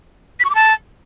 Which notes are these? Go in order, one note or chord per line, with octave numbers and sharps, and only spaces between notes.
B6
C#6
D6
A5